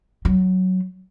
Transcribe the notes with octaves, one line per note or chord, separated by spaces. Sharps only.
F#3